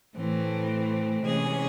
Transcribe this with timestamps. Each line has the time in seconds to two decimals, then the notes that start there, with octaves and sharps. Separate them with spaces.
0.14 A2 E3 A3 C4
1.22 C3 E3 G#3 C#4 G#4